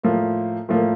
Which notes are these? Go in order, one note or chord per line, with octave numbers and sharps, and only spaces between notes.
A2 F3 A#3
A2 F3 A#3